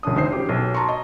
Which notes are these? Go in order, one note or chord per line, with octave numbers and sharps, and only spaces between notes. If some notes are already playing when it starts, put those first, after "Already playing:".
C#2 C#4 D4 D#6
D2 D#4 C5 C7
C#4 G4
B1
A5 A#5 C6 C#6
D#5